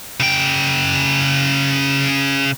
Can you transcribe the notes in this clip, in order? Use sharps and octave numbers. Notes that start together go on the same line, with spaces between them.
C#3 G5